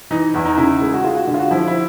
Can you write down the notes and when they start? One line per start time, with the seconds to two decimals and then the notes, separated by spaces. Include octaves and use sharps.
0.11 E3 D#4
0.34 E2 E4
0.46 D#4
0.58 C#3 E4
0.81 G#3
0.94 F#4
1.04 G#3 F4
1.17 F#4
1.27 D3
1.34 F4
1.39 F#4
1.51 F3 E4
1.67 E4